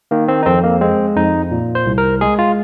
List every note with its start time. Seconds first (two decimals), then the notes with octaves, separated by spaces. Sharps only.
0.11 D#3 A#3
0.28 C4
0.43 D#4
0.46 F2 C4
0.64 A#3
0.81 G#3 C4
1.16 F2 D#4
1.51 A#2
1.75 C5
1.86 C2
1.98 A#4
2.21 G#3 G#4
2.39 F4